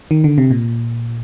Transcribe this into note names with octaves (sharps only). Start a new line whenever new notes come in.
D#3
D3
C3
A#2